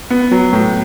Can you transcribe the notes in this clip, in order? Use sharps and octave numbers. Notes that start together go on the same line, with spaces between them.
B3
F#3
A2